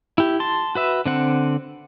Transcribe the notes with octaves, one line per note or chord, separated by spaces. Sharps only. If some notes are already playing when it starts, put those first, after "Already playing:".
E4 G4
A5 C6
F#4 B4 E5
D3 C4 F#5